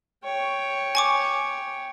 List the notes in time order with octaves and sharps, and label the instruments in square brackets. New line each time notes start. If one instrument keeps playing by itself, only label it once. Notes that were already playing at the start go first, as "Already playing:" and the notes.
[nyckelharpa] C#5 G5
[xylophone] G#5 C#6 D6